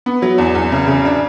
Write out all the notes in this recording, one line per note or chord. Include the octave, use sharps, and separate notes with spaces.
B3
F#3
E2
E2
C#3
C#3
D4